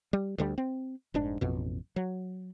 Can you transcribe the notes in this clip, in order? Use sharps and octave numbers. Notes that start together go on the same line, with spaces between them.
G3
D2 D3 G3
C4
F1 G#2 D4
A1 F2 B2
F#3